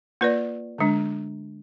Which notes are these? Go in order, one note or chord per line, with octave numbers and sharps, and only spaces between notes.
A#3 F4 B4 D5
D3 G#3 D4